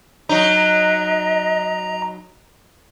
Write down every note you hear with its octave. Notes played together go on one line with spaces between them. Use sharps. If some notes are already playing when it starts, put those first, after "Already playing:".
F#3 D#4 D#5 A#5